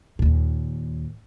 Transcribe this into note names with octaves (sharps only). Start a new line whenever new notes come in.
D#2 A#2